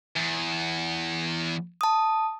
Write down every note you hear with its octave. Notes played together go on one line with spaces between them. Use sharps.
E2
A5 D#6